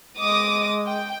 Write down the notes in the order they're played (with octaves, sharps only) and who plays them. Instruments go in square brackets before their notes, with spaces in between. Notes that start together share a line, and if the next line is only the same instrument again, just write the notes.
[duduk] G#3 [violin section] D#5 D6 D#6
[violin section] G5